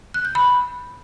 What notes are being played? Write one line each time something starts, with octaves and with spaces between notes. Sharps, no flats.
F#6
G6
B5